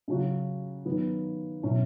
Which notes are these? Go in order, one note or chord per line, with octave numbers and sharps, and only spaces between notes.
C#3 F#3 C#4 F#4
D#3 F#3 B3
B2 F#3 C#4 E4